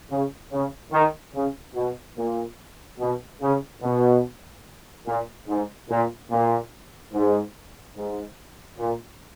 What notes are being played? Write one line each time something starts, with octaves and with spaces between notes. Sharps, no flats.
C#3
C#3
D#3
C#3
B2
A#2
B2
C#3
B2
A#2
G#2
A#2
A#2
G#2
G#2
A#2